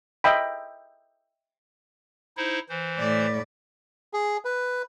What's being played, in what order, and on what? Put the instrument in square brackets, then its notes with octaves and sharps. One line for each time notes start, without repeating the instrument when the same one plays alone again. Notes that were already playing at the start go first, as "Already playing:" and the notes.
[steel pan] D#5 E5 G5 B5
[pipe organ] D#4 E4 C5
E3 C5
[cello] A2 D5
[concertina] G#4
B4